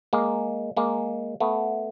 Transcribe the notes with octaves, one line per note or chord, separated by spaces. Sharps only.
G#3 A#3
G#3 A#3
A3 B3